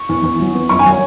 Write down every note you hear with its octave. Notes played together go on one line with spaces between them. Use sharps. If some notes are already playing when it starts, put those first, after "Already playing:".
Already playing: C#6
E2
E2
F#3
B3
F#2 C#6
G#5
F#3
C#5